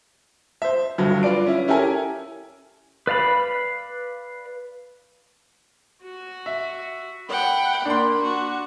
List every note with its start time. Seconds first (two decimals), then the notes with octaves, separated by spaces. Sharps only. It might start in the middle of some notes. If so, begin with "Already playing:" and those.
0.62 C5 E5
0.98 G1 G2 F#3
1.23 F4 B4 D5 D7
1.46 C#4 E4
1.68 C#4 E4 G4 A4 A#4 G#5
3.07 B4 D5 F5 B5
6.04 F#4
6.46 E5
7.29 F#5 G5 B5
7.85 A#3 D4 C6
8.23 F#4